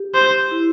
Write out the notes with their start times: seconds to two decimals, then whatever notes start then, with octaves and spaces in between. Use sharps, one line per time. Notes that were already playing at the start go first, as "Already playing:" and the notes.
Already playing: G4
0.15 C5
0.51 E4